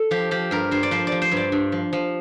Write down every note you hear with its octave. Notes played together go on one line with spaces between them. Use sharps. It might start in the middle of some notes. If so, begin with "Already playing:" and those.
Already playing: A4
F3 G4
F3 G4
G2 A#4
G2 C5
D5
F3 C5
F3 D5
C5
G2 D5
G2
F3
F3